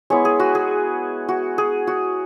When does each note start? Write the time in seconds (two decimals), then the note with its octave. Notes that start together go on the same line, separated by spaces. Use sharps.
0.10 G#3 B3 E4 C#5
0.25 G#4
0.40 F#4
0.55 G#4
1.28 F#4
1.58 G#4
1.87 F#4